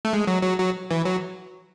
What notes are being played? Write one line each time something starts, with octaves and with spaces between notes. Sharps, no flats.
A3
G#3
F#3
F#3
F#3
E3
F#3